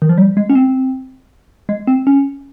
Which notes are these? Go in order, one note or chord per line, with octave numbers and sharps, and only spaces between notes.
D#3
F3
G3
G#3
C#4
C4
G#3
C4
C#4